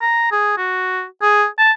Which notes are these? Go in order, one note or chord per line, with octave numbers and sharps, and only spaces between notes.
A#5
G#4
F#4
G#4
A5